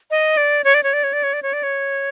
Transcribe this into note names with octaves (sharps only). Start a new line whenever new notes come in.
D#5
D5
C#5
D5
C#5
D5
C#5
D5
C#5
D5
C#5
D5
C#5